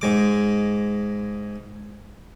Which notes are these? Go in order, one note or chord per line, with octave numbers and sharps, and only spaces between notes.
G#2 G#3 D6